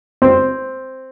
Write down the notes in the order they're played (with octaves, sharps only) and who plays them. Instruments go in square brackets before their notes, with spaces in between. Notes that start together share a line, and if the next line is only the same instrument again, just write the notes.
[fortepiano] C4